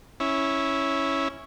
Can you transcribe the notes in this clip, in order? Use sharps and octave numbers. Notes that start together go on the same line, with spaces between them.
C#4 E4